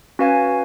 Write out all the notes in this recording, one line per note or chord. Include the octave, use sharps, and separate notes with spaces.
C#4 F#4 B4 F5 G#5